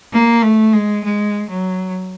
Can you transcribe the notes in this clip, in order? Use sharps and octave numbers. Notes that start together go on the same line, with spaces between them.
A#3
A3
G#3
G#3
F#3